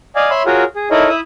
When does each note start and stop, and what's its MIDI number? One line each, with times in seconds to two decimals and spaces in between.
0.16 0.30 74
0.16 0.30 75
0.16 0.30 77
0.16 0.30 80
0.30 0.43 73
0.30 0.43 76
0.30 0.43 83
0.30 0.43 84
0.46 0.64 65
0.46 0.64 66
0.46 0.64 68
0.46 0.64 70
0.46 0.64 73
0.76 0.89 68
0.91 1.09 63
0.91 1.09 64
0.91 1.09 69
0.91 1.09 70
0.91 1.09 73
0.91 1.09 75
1.09 1.20 64
1.09 1.20 76
1.09 1.20 87